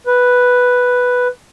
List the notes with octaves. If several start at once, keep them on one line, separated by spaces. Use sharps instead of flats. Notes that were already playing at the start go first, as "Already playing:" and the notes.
B4